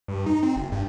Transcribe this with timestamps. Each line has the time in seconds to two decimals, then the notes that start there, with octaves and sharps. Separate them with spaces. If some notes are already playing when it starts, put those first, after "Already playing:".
0.08 G2
0.26 D#4
0.43 C4
0.56 F#1
0.72 G2